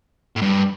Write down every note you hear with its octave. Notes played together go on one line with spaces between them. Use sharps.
A2
G2